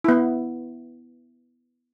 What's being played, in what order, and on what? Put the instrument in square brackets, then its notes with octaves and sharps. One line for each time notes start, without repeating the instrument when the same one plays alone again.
[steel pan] B3 E4